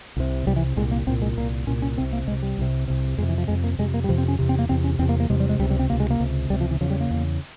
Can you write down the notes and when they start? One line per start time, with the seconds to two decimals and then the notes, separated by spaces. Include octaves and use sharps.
0.17 C2 C3
0.46 C2 C3 G3
0.56 E3
0.77 C2 A#2 G#3
0.91 A#3
1.07 C2 A#2 C4
1.22 G#3
1.37 C2 A#2 A#3
1.67 C2 A#2 C#4
1.82 C#4
1.98 C2 C3 C4
2.13 A#3
2.28 C2 G#3
2.31 C3
2.43 G3
2.58 C2 C3
2.88 C2 C3
3.18 F2 G#3
3.22 C3
3.29 E3
3.38 F3
3.48 F2 C3 G#3
3.64 A#3
3.78 F2 C3 G#3
3.94 A#3
4.04 G3
4.09 F2 C3 F3
4.18 C4
4.28 C#4
4.39 E2 C3
4.49 C4
4.59 A#3
4.69 E2 C3 C4
4.84 C#4
4.99 E2 C4
5.02 C3
5.09 A#3
5.20 A#3
5.30 E2 C3 G#3
5.40 G3
5.49 G#3
5.59 C#2 C3 G3
5.70 G3
5.79 C4
5.89 C#2 C3 A#3
6.00 G#3
6.10 A#3
6.20 C#2 C3
6.50 C#2 G3
6.53 C3
6.61 F3
6.71 E3
6.81 E2 C#3 F3
6.90 G3
7.01 A#3
7.10 E2 C#3